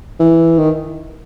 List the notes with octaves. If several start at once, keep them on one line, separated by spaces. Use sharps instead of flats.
E3
D#3